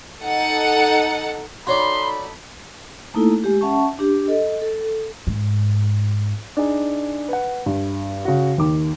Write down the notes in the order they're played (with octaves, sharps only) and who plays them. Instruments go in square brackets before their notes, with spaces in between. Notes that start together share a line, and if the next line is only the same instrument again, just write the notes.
[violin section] D#4 A4 F#5
[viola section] D#4 A4 B5 [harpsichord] F#4 C#5 D5 [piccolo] C6
[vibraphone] A3 A#3 D#4 E4 A4
G#3 G4
C#4 E5 F#5 A5 C#6
D4 G4
A4 D#5
A4
[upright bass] G#2
[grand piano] D4 D#4 G#4
B4 F#5
G2
C#3 F#4
D#2 D#3 D6